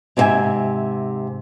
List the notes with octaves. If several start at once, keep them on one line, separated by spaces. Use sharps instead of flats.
G#2 C3 F4 G#4 E5 G#5